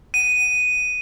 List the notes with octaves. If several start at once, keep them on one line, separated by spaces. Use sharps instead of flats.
D#7